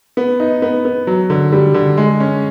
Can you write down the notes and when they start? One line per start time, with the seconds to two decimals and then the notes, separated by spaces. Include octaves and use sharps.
0.17 B3
0.40 D#4
0.62 B3
0.85 B3
1.07 F#3
1.30 D3
1.52 G3
1.74 D3
1.97 G#3
2.20 C#4